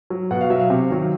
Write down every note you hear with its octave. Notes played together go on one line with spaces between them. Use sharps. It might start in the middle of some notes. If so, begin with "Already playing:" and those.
F#3
B2 F#5
F5
F#3 E5
F5
C3
D#3 F#3